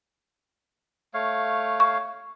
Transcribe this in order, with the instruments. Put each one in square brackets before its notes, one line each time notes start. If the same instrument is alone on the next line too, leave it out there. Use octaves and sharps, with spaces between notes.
[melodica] A3 C#5 F5
[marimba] C#6